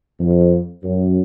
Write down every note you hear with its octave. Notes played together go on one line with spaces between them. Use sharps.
F2
F#2